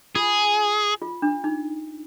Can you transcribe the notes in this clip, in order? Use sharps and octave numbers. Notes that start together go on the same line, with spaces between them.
F4 G#4
F4
D4
D#4